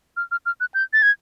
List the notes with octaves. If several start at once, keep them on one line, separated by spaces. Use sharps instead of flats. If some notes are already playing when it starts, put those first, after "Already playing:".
F6
F6
F6
F#6
G6
A6
G#6